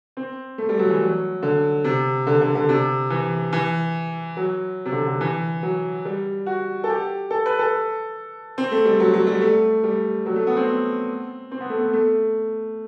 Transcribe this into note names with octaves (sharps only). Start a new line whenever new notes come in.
C4
A3
G3
F#3
E3
F#3
D3
C3
D3
D3
D3
C3
E3
E3
F#3
C3
D3
D3
E3
F#3
G3
F#4
A4
G4
A4
B4
A4
C4
A3
G3
F#3
F#3
G3
A3
G3
F#3
A3
B3
C4
C4
B3
A3
B3
A3